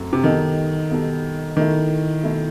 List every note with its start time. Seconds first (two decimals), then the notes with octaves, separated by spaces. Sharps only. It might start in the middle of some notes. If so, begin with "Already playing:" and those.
Already playing: F#2 F#3 A3 C4
0.13 C3
0.24 B2 D#3 G3 B3 D#4 A4
0.91 B2 G3 B3 D#4 A4
1.57 B2 D#3 A3 E4
2.23 B2 A3 E4